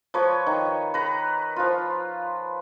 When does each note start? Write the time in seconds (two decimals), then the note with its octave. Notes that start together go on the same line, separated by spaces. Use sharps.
0.14 F3 B4 C#5
0.47 D#3
0.94 B4 A#5
1.56 F3 F4